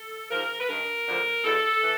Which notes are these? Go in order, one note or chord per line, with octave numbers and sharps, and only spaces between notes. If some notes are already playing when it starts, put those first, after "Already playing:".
Already playing: A4
G#2 F3 A#4
B4
G2 D#3 A#4
D2 D3 F3
E2 B2 A4
E3